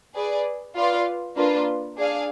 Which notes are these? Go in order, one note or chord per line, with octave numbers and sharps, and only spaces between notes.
G#4 B4 D5
F4 B4 D5 F5
A#3 D4 F4 B4
D4 G#4 D5 F5